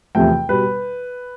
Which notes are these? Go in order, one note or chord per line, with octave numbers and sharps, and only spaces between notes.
E2 C3 F3 A3 G5
B2 G3 B4